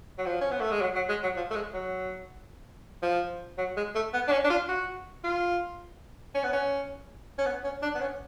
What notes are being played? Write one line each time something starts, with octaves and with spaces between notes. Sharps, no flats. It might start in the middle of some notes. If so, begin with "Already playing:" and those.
F#3
F3
C#4
B3
A3
G#3
F#3
F#3
G#3
F#3
F3
A3
G#3
F#3
F3
F#3
G#3
A3
B3
D4
C#4
D4
F4
F#4
F4
C#4
B3
C#4
C#4
B3
C#4
D4
B3
C#4